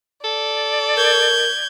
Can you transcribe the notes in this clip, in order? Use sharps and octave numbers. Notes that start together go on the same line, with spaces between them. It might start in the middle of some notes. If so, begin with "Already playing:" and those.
A4 D5
A#4 G6 G#6